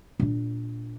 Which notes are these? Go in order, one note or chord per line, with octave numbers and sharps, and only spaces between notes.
A#2 D4